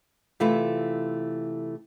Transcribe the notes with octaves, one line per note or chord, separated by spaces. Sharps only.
C3 E3 A3 E4 F4 A4